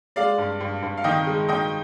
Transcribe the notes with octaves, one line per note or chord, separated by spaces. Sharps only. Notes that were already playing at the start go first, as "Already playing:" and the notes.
G#3 D5 F5
G2
G2
G2
F5
D#3 D#5 G5
G#3
D#3 D#5 G5